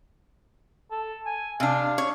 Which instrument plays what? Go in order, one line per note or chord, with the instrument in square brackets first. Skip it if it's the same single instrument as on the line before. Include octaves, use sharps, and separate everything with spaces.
[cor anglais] A4
G#5
[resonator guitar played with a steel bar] C3 D4 [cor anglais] F5
[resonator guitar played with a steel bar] C#5